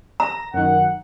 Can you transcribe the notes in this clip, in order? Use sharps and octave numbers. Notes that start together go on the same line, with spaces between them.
A#5 A#6
F#2 D#3 F#5